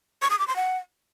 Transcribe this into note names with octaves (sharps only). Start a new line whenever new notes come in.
C#6
D#6
D6
C6
F#5